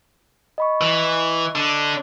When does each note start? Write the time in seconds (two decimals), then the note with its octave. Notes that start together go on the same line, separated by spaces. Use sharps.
0.58 D#5 B5 C#6
0.81 E3
1.55 D3 D4